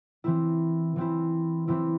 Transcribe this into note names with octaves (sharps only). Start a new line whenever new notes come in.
E3 C4 E4
E3 C4 E4
E3 C4 E4